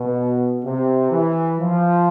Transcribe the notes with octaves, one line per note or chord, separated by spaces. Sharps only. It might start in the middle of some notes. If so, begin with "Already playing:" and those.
Already playing: B2
C3
E3
F3